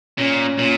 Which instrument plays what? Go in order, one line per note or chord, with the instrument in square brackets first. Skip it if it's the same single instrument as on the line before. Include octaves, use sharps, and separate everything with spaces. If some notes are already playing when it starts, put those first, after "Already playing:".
[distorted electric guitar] A#2 [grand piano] C#4
[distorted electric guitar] A#2 [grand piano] C#4